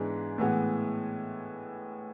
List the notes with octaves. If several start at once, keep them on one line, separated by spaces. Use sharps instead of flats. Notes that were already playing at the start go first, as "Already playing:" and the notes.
Already playing: G#2 E3 G#3 B3 D4
A2 E3 G#3 B3